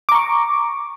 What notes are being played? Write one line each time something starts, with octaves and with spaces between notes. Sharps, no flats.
A#5 C#6 D6